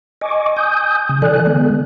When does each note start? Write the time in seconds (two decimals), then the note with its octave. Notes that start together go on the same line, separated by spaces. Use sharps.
0.21 D#5 G#5 C#6 D6
0.57 G#5 D#6 G6
1.09 C#3
1.22 E3 A4 D5 G#5 F#6
1.46 D3 G#3 B3